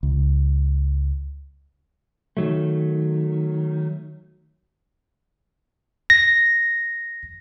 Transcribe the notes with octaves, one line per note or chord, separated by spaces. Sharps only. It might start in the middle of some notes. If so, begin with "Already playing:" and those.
C#2
D#3 F#3 A3
A#6